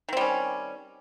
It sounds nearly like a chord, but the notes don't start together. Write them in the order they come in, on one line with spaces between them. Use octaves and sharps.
D#3 C4 G3 C#4